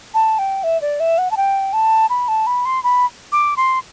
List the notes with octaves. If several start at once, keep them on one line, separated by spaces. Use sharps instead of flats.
A5
G5
E5
D5
E5
F#5
A5
G5
A5
B5
A5
B5
C6
B5
D6
C6